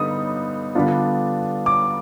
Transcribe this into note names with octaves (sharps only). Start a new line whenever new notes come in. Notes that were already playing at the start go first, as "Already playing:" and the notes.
Already playing: D3 G3 B3 D#4 D#6
D3 G3 B3 D4 F4
D6